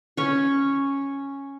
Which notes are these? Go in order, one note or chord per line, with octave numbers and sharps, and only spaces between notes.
C#4 C#6